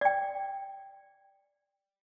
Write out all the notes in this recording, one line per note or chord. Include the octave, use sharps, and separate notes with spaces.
D5 G5